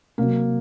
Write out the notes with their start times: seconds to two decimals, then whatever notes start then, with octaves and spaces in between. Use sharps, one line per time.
0.18 C3 F#3 A#3